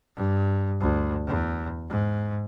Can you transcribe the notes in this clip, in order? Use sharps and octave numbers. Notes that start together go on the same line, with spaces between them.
G2
D2
E2
G#2